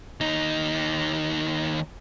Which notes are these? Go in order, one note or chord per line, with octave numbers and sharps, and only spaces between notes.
D#2 D#4